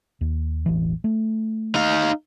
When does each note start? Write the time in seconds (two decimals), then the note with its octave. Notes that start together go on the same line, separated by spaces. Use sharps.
0.21 D#2
0.66 E1 A1 E3
1.04 A3
1.75 D#4 F5